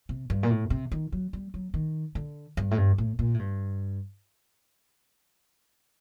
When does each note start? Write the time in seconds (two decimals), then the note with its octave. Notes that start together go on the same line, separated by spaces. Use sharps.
0.09 C3
0.30 G2
0.43 A#2
0.50 A2
0.70 C3
0.92 D#3
1.12 F#3
1.33 G3
1.54 F#3
1.74 D#3
2.15 D3
2.57 G2
2.71 A2
2.78 G2
2.98 A2
3.19 A#2
3.34 A2
3.39 G2